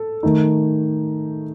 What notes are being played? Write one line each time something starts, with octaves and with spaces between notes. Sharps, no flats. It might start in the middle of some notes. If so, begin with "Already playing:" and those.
Already playing: A4
D#3 A3 D#4